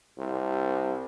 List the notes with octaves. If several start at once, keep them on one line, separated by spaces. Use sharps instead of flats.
C2